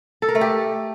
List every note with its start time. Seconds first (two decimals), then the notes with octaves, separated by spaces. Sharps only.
0.22 A4
0.29 A#4
0.35 A3
0.41 G4